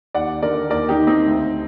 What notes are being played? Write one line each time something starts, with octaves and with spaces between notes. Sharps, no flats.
D#2 D5 F#5
D3 A#4 D5
D#2 A#4 D5
D#4 G4
D#3
C4 D#4
D2